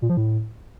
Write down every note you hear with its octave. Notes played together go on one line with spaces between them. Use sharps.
A#2
F3
A2